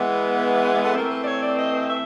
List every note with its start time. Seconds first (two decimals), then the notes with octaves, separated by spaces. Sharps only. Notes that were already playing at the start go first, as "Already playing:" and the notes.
Already playing: E3 G#3 B3
0.85 A4
0.94 E3 A3 C4 A#4
1.10 B4
1.22 D5
1.25 C#5
1.41 D5
1.56 D#5
1.87 E5